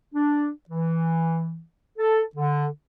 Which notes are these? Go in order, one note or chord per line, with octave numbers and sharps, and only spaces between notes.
D4
E3
A4
D3